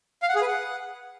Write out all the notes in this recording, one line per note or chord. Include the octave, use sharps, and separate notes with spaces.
F5
F#5
G#4
B4
F#5